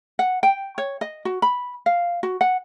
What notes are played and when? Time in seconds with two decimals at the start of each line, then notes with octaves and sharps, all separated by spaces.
0.19 F#5
0.43 G5
0.78 C#5
1.01 D#5
1.25 F#4
1.42 B5
1.86 F5
2.23 F#4
2.41 F#5